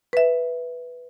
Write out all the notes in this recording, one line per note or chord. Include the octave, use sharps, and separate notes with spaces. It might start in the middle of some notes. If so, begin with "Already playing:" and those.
B4 E5